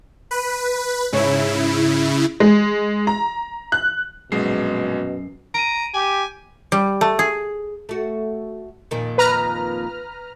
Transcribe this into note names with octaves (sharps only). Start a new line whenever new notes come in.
B4
G#2 C#3 E4 C#5
G#3
A#5
F#6
A#1 F#2 B2 G#3 C7
A#5 D7 D#7
G4 G#5
G3
A3
G#4
A3 F#4
F2 A#2 D#3
B4 A#5 F6